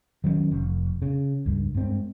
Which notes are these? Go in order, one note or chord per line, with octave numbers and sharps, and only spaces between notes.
D#3 F#3 G#3 C#4
F1
C#3
C#2 G2
G2 G#3 C4